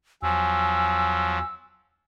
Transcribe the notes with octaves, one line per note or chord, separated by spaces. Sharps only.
E2 F3 F#3 G#5 E6